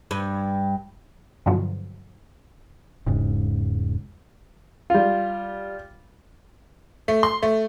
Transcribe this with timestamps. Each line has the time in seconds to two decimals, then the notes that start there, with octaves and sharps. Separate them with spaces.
0.11 G2
1.46 G2 B2 D3 F3 F#3
3.06 E1 G#2 C#3
4.90 G3 F4
7.08 A3
7.23 C6
7.42 A3